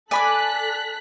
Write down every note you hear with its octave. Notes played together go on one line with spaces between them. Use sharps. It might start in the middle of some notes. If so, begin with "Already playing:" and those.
A4 D5 G#5 B5 D6 F#6 B6